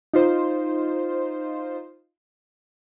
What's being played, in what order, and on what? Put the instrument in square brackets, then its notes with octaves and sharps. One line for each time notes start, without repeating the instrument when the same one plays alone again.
[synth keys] D#4 F4 C5